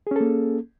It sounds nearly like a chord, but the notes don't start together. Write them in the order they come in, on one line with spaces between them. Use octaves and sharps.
G#4 C#4 A4 A#3